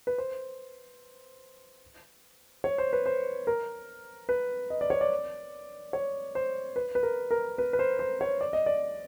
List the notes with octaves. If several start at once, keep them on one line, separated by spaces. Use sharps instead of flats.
B4
C5
C#5
C5
B4
C5
A#4
B4
D#5
D5
C#5
D5
C#5
C5
B4
B4
A#4
A#4
B4
B4
C5
C5
C#5
D5
D#5
D5